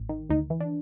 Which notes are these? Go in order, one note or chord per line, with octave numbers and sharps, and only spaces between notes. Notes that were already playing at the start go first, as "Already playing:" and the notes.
Already playing: A1
D#3
D2 D#4
E3
D4